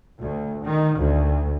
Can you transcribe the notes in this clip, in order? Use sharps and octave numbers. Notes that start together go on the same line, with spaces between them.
D2
D#3
D2